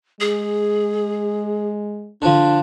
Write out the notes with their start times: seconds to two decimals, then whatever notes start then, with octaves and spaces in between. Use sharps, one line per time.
0.20 G#3 G#4
2.22 D3 F3 D4